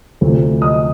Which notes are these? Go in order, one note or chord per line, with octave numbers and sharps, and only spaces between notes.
D2 C3 F3 A3 C4
D#5 D#6